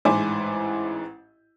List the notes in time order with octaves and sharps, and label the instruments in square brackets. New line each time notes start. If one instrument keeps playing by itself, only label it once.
[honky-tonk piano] A1 G#2 E4 C5 G#5 D6